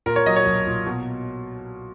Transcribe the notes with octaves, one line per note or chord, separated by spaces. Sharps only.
A#2 A#4
C#5
F#3 D#5
C#5
B1
A#2
B2